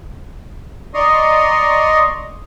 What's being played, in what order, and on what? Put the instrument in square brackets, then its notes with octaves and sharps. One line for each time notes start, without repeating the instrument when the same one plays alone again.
[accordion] D5 D#5 A#5 C6 C#6 D#6